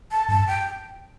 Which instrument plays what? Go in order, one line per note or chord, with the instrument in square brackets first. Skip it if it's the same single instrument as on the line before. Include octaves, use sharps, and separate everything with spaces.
[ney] A5
[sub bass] G2 [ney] A5
[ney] G5